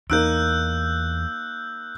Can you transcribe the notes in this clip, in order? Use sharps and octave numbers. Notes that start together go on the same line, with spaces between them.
E2 A#3 D#4 E6 F#6 G6 D7